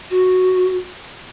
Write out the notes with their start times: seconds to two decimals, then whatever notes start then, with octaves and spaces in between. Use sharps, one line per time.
0.10 F#4